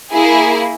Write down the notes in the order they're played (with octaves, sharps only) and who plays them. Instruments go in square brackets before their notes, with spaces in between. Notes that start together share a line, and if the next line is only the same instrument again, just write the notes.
[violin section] A#3 E4 G#4